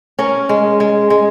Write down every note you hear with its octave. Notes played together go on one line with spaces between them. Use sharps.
C#4 A#4
G#3
G#3
G#3